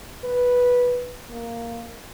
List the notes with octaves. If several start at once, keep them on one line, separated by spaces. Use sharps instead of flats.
B4
A#3